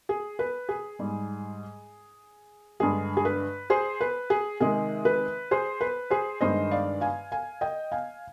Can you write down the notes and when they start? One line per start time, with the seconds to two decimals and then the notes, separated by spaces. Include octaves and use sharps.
0.09 G#4
0.39 B4
0.69 G#4
0.99 G#2 G3
2.80 G2 D3 G#3 G#4
3.17 G#4
3.25 B4
3.70 G#4 C5
4.01 B4
4.30 G#4
4.60 C3 D#3 G#3 G#4
5.05 B4
5.51 G#4 C5
5.81 B4
6.10 G#4 C5
6.41 G2 D#3 G#3 C5 D#5
6.71 D5 F5
7.01 F5 G#5
7.32 F5 G#5
7.61 D#5 G5
7.92 F5 G#5